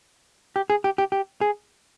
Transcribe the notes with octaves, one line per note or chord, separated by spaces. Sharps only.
G4
G#4
G4
G4
G4
G#4